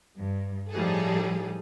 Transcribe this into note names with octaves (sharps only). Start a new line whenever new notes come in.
G2
A2 F3 G3 D#4 G#4 A4